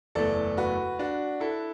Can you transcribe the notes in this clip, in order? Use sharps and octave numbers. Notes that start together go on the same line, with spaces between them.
F#1 E2 E3 A3 A4 D5
F#4 B4
D4 F#4
E4 A4